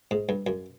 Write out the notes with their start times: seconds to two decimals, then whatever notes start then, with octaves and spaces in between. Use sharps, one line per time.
0.11 G#2
0.29 G2
0.47 F#2